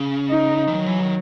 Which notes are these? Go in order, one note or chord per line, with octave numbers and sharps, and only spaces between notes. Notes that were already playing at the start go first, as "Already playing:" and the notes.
Already playing: C#3
D#4
E3
D#3 F#3
E3
D#3